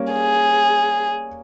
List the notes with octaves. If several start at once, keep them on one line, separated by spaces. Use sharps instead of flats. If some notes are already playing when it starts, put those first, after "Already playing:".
Already playing: G3 A#3 C#4
G#4